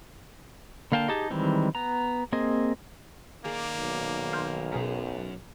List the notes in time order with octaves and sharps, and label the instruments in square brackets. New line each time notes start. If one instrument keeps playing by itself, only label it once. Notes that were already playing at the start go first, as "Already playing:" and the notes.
[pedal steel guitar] D3 A#3 F5 G5 A5
D#4 G4 G#4 A5
D#3 E3 G3 G#3 C4
B3 A#5
A#3 C4 G#4 D#5
[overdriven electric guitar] D#3 D5 [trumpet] A#3 [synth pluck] G#4
[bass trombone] B1
[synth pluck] C6 F6 G6
[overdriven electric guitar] F#2 [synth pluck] B2 G#4 A#4